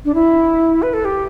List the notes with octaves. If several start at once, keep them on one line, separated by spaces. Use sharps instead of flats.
D4
E4
B4
A4
G4